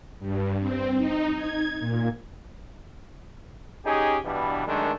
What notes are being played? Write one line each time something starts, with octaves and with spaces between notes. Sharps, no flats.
G2
C4
D#4
G#6
A#2
C#4 D#4 G4 G#4
G2 B2 E3 G3 D4
F#2 D#3 G#3 A3 D4